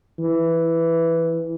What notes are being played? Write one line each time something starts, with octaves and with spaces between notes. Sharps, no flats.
E3